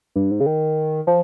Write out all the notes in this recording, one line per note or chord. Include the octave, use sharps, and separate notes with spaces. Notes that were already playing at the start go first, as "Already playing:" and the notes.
G2
G#2
C#3
D#3
F3